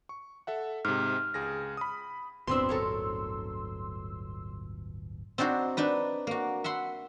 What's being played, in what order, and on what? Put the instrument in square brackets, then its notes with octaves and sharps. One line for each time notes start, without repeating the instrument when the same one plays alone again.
[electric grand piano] C#6
A4 E5 F#5
[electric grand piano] G#2 C3 [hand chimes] F6
[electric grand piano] C#2 G#4 A#6
B5 D#6
[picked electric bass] D1 G1 B2 [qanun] B3 C4 D4 [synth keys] C6 E6
[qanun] A4 A#4 C#5
[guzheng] C4 D4 D#4 F#4 C5
D4 D#4 B4
A#3 F#4
E5 F#5 B5 C6